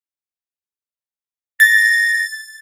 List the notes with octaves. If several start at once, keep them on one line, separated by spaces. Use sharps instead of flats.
A6 A#6